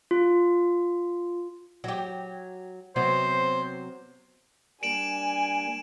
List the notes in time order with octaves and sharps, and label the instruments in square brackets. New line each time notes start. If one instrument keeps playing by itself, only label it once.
[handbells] F4
[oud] F#3 G4
[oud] C3 F#3 B3 [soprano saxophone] C5
[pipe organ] G3 A#3 D4 [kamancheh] G#5 [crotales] D7 E7 F#7